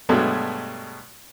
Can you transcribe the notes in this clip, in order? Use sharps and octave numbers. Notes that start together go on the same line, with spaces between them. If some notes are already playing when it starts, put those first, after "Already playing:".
G2 B2 F#3 G#3 A3